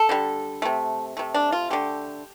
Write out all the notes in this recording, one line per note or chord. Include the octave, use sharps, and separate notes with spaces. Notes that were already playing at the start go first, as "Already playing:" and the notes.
Already playing: A4
D3 G3
C3 A3
C3 A3
D4
F4
D3 A3 G4